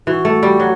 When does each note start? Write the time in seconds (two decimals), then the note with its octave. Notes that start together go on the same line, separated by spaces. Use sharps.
0.07 E3 F#4
0.25 A3
0.43 G3
0.60 F#3